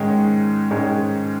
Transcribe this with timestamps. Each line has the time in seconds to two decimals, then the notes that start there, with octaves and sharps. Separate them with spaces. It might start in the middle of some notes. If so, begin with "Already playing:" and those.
Already playing: G#2 D#3 G#3 C#4
0.71 G#2 D#3 G#3 C#4